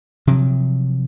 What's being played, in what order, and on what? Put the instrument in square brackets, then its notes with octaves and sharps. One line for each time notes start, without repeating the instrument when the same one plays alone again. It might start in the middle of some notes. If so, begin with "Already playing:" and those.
[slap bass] C3 F3 F#3